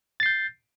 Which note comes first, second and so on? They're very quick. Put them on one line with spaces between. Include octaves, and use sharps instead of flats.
A6 C7 G6